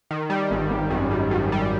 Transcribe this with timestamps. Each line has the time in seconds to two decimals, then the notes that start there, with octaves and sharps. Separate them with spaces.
0.11 D#3
0.30 G3
0.51 G#1
0.70 G#1
0.91 F#2
1.11 F#2
1.31 F#2
1.52 G3